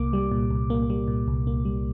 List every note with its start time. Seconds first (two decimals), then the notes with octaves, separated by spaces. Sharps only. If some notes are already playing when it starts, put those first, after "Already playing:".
Already playing: C2 A#3 D6
0.13 G3
0.31 A#2
0.51 C2
0.70 A#3
0.90 G3
1.08 A#2
1.28 C2
1.47 A#3
1.65 G3